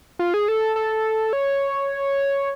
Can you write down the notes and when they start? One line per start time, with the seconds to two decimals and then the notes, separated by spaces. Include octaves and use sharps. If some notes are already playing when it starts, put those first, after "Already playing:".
0.19 F4
0.34 G#4
0.48 A4
0.76 A4
1.33 C#5